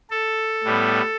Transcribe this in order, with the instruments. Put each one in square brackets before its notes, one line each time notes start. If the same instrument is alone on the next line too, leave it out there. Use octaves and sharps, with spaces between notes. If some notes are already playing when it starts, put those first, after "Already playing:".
[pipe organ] A4
A2 G3 B3